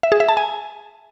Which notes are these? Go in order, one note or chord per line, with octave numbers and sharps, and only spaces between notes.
E5
G#4
E5
A5
G#5